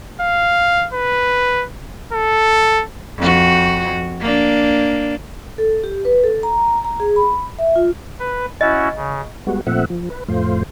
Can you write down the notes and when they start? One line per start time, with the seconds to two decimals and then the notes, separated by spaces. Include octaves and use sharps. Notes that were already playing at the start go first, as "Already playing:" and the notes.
0.21 F5
0.94 B4
2.13 A4
3.18 F2 F#4
4.21 A#3 D4
5.58 A4
5.84 G4
6.05 B4
6.24 A4
6.43 A#5
6.85 A#5
7.00 G#4
7.16 B5
7.59 E5
7.76 F4
8.20 B4
8.61 C#4 E4 F#4 D#5
8.96 C#3
9.47 G3 G#3 B3 F#4
9.67 A#2 F3 A3 C4 E5 F#5
9.90 F3
10.10 B4
10.28 F2 A2 A3 F4 C5